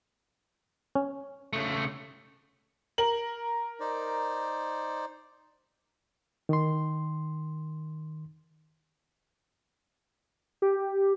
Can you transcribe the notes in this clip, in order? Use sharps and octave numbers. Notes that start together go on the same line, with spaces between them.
C#4
C#3 A3
A#4 F#7
D#4 C5 D5
D#3 C6
G4